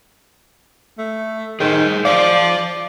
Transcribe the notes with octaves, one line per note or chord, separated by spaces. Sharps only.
A3
D#3 G#4 C5
C5 D5 F5